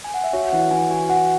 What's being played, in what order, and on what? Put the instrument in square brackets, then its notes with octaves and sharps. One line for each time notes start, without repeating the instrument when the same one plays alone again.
[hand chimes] G#5
F#5
E5
[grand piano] F#4 [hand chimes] C#5
[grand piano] E3 [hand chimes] F#5
[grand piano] E3 [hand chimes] G#5
[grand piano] F#4 [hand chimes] G#5
[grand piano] F#4 [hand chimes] F#5